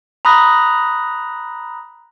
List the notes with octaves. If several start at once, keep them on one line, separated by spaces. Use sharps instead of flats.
A#5 B5 D#6 F#6 A#6